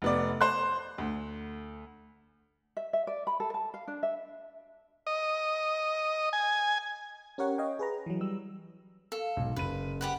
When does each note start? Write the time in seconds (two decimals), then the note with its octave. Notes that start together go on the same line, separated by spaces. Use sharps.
0.02 F1 B3 D5
0.41 C5 C6 F#6
0.98 D2
2.77 E5
2.93 E5
3.07 D5
3.27 B5
3.40 A4
3.54 A5
3.74 F5
3.88 D4
4.03 E5
5.07 D#5
6.33 G#5
7.38 C#4 G4 A#4 C#5 F#5
7.58 C#5 D#5 F5 G5
7.79 G#4 B4 A#5
8.06 E3 F#3
8.21 G3 E6
9.12 A4 F5
9.37 B1 G#2
9.56 F#1 B4 D#7
10.01 G4 B4 F#5